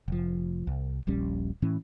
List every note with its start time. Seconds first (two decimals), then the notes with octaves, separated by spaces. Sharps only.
0.08 F1 F3
0.67 C2
1.07 D#1 A#1 G3 C#4
1.62 A2 E3 C#4